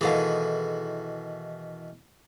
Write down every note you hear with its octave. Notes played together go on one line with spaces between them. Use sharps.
B2 D#3 E3 G#4 A4 F5